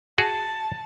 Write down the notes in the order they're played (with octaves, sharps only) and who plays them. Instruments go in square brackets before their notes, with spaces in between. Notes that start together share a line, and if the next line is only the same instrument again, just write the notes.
[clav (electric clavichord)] F#4 G#4 [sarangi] A5